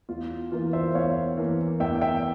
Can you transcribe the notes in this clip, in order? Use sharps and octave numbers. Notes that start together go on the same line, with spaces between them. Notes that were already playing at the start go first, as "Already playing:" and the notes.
E2 F4
E3 A#3 F4
C5 E5
E2 C#5 F5
E3 A#3
E2 E5 G5
E5 G5